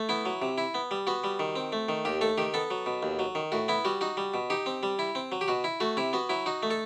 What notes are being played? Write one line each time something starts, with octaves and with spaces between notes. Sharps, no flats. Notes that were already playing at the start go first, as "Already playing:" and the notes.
Already playing: A3
B3 E4
F#3
C3
E4
B3
G3
B3 F#4
G3
D#3
C4
A3
D#3
D#2 G4
A3 A4
D#3 G4
B3 A4
F#3
B2
D#2
F#3
D#3
A2 F#4
B3 E4
G3 F#4
D#4 F#4
G3
B2
D#4 G4
C4
G3
E4
C4
F#3
G4
B2 F#4
E4
A3 F#4
C3 E4
B3 F#4
F#3 E4
D#4 F#4
A3
A4